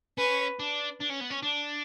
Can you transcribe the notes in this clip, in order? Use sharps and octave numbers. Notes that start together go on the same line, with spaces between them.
C#4 B4
D4
D4
C#4
B3
C#4
D4